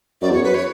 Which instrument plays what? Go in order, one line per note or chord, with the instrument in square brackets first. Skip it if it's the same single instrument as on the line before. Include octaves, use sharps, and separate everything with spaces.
[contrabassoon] F#2 [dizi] D5
[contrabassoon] E2
[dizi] C#5
[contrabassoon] F#2
[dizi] B4
C#5